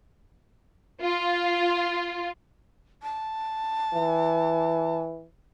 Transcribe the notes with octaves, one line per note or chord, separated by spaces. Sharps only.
F4
A5
E3